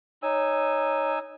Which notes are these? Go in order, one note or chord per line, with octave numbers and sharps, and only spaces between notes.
D#4 C#5 G#5 E6